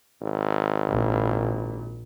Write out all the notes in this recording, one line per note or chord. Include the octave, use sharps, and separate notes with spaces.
G#1
A#1